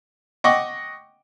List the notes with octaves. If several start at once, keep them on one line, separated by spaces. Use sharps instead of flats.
D#5 F#5 G5 C#6 D6